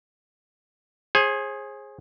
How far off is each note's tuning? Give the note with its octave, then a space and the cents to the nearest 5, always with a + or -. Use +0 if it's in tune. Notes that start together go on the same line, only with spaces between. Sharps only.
G#4 +0 C5 +40